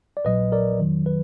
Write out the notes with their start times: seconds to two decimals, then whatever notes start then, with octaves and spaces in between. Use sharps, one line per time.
0.17 D5
0.25 A#1 A#2 F#3 B4 D#5
0.52 A#4 D5
0.79 F2 D#3 F#3
1.06 B4